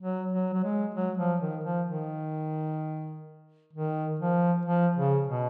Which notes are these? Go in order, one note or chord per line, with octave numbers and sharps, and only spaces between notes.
F#3
F#3
F#3
G#3
F#3
F3
D#3
F3
D#3
D#3
F3
F3
C#3
B2